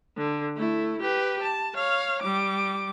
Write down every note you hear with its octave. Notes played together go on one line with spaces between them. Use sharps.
D3
A3 E4
G4 B4
A5
C#5 F5
G3 D6